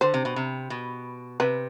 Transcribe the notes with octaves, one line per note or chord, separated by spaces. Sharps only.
D3 C5
C3
B2
C3
B2
C3 B4